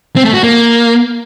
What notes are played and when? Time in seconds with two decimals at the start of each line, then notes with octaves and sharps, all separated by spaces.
0.16 C4
0.25 A3
0.34 F#4
0.43 A#3